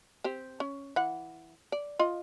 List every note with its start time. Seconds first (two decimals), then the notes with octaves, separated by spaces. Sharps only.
0.24 C4 G4
0.60 C#4
0.96 E3 F#5
1.72 D5
1.99 F4 D#5